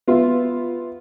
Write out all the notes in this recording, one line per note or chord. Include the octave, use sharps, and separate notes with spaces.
B3 F4 E5